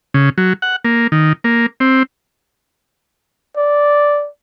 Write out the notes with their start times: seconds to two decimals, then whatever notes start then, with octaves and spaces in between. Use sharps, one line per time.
0.14 C#3
0.38 F#3
0.62 F#5
0.85 A#3
1.12 D#3
1.44 A#3
1.80 C4
3.57 D5